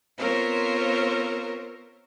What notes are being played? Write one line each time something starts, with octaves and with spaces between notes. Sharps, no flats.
B3 C4 F4 A#4 C5 C#5